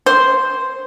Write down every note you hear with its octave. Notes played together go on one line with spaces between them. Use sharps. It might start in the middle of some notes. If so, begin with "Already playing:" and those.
C5